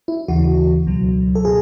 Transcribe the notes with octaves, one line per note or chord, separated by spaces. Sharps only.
E4
D#2 C#3 E3 F#4
C#2 B2 F#3
A4
B2 G#4